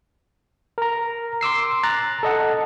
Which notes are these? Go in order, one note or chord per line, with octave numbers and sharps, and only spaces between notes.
A#4 A#5
C6 D6 E6 C7
A#5 F#6 A6
A4 D#5 F#5